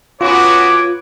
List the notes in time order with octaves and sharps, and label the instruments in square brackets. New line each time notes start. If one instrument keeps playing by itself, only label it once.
[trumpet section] B3 C#4 F#4 [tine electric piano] F4 [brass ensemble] B4 C#5 [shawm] D6